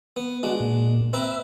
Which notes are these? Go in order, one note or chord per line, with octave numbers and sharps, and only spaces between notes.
B3
G#3 D4 F#4
A#2
C4 B4 E5 A#5